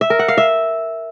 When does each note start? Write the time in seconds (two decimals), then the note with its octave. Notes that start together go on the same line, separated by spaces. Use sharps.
0.01 E5
0.10 A#4
0.19 F#5
0.28 F5
0.38 E5